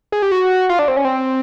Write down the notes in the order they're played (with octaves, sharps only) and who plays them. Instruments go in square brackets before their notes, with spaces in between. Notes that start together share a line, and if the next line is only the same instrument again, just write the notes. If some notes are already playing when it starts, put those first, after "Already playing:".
[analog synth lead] G#4
G4
F#4
F4
D4
C4
C#4
C4